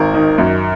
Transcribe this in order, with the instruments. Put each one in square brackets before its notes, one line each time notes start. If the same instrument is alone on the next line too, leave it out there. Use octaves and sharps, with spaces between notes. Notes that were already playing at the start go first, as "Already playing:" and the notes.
Already playing: [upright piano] G#1 A#4
D#3
F#2